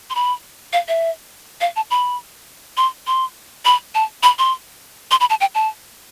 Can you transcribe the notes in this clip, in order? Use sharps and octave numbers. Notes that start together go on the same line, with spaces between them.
C6
B5
F5
E5
F5
A5
B5
C6
C6
B5
A5
B5
C6
C6
B5
A5
G5
A5